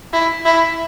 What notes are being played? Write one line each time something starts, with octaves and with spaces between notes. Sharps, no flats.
E4
E4